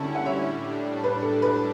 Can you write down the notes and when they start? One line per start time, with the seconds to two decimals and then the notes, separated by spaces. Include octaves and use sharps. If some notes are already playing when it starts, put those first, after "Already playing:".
Already playing: D3 G3 C#4 E4 A5 C#6
0.15 F#5
0.26 C#5 E5
0.45 A2 G3 D4
1.04 B4
1.22 A4
1.42 B4